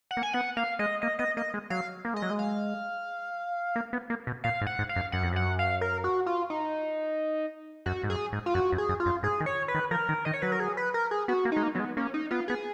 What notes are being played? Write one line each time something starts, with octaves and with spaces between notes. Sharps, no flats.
F#5
A#3
G#5
B3 F#5
A#3 F5
G#3 D#5
A#3 D#5
B3 D#5
A#3 D#5
G#3
F#3 F5
A#3
G#3 D#5
F#3
G#3
F5
A#3
B3
A#3
B2
A#2 F5
G#2
F#5
G#2
F5
F#2
F#2 F#5
F2
F#2 F#5
F5
A#4
F#4
F4
D#4
F#2 F#4
G#2
F#2 G#4
G#2
F4
F#2 F#4
F#2
G#4
F#2
F4
F#2
G#2 G#4
D#3
C#5
B4
D#3
F3 A#4
D#3
D#3 D#5
C#5
F#3 B4
A#4
G#4
B4
A#4
G#4
B3 F#4
A#3
G#3 D#4
A#3
F#3 B3
G#3
A#3 C#4
D#4
B3 F4
B3 G#4